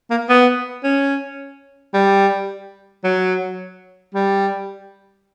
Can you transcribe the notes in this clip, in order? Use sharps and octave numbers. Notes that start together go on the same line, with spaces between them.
A#3
B3
C#4
G3
F#3
G3